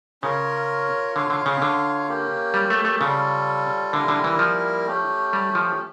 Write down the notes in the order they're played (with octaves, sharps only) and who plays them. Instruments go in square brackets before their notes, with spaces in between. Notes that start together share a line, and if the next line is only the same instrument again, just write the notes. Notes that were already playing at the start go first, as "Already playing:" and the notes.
[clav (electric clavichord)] C#3 [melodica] C#4 F4 A#4 C#5
[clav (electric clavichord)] D3 [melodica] F4 C#5 F5
[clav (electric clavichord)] D3
C#3
D3
[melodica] A#3 C#4 G4
[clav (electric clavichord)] G3
A3
A3
[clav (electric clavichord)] C#3 [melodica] G3 C#4 F4 A4
[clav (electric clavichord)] D3 [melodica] G3 A#3 E4 A#4
[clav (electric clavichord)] D3
E3
F3
[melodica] A3 C#4 G4
[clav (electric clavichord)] G3
F3